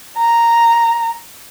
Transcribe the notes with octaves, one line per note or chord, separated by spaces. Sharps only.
A#5